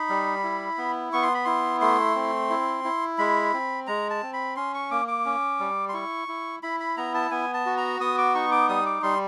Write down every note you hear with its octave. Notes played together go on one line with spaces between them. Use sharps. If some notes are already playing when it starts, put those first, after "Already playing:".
Already playing: D#4 B5
G3
E4
B3
B3 C#6
C6
B5
E4 C6
A3 C6
C4
E4
E4
G#3 B5
C4
G#3 A#5
A5
C4
B5
C#4 C6
C#6
A#3 D6
D6
C#4
G3
C6
E4 C#6
E4
E4 B5
B5
B3 A#5
A5
B3 G#5
A5
F#4
A#5
B3 D#6
D6
D#4 C#6
D6
G3 D#6
D6
G3 C6